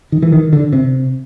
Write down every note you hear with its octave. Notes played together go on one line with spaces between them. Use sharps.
D#3
E3
D#3
D3
C3